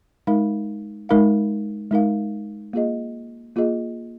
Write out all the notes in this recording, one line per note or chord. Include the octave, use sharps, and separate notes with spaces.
G#3 D#4 A#4 F5
G#3 D#4 A#4 F5
G#3 D#4 A#4 F5
A#3 F4 G#4 D#5
A#3 F4 G#4 D#5